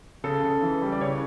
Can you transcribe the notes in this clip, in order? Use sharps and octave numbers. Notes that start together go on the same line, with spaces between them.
C#3 A4
C#3
E3
G3
D5
C#3 C#5